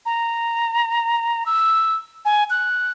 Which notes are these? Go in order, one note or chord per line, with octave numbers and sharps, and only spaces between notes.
A#5
E6
G#5
F#6